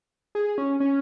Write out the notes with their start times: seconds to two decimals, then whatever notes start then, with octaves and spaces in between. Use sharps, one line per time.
0.35 G#4
0.58 C#4
0.80 C#4